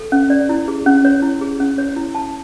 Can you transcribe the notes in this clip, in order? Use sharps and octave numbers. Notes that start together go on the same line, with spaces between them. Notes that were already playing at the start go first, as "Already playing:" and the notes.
Already playing: A4
C#4
D5
E4
G#4
C#4
C#5
E4
G#4
C#4
C#5
E4
A5